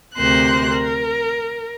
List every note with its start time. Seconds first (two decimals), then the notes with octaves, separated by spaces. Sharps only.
0.16 D2 C3 A#4 C5 C6 F#6
0.70 A#4